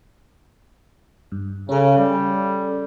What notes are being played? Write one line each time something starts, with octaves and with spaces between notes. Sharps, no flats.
G2
C#3 C#4 A4
G3